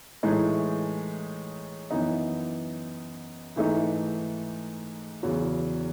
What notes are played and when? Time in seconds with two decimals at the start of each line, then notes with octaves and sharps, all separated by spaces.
0.23 A2 E3 G#3 D#4
1.91 F#2 E3 B3 D#4
3.56 G#2 E3 A3 D#4
5.23 E2 C#3 F#3